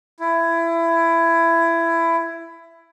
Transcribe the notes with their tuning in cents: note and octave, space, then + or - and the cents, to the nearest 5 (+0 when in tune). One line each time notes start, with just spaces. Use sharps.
E4 +20